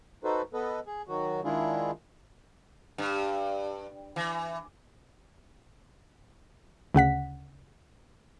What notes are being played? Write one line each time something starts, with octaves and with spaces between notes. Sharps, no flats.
D#4 F#4 A4 B4 C5
B3 A4 B4 D#5
G#4
D#3 F#3 F#4
D#3 G#3 D4 E4 F4 G#4
G2
E3
D2 C#3 F#5 B6